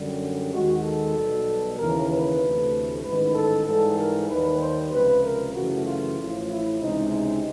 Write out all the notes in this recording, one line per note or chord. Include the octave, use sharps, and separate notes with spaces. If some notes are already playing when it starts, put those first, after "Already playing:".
Already playing: F#2 D3 G3
D#2 D#3 G#3 F#4
A4
B1 B2 G3
D#2 C#3 E3 A#4
B4
D2 C3 E3 A3
A1 G#2 D#3 B4
A4
G#2 E3 G3 A4
A#4
D#2 D#3 G3 B4
C5
C#2 C3 F3 B4
A#4
F#2 C#3 E3 A3 F#4
F4
A1 A2 F3
E4
C#2 C3 E3 G#3 D#4
D#4